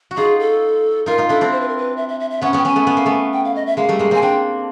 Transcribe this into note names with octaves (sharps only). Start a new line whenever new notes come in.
F#4
D#4 F4 G#4
A4
D#4 F4 A#4
D#4 F4
D4 E4 A4
C4 D4
C5
B4
A#4
B4
E5
E5
E5
E5
B3 C#4 F#5
B3 C#4 G5
B3 C#4 G#5
A3 B3
B3
A#3
A3 B3
G5
F5
D#5
E5
G#3 A#3 F5
G3 A3
G#3 A#3
A#3 C4 G#5
C4 D4 G5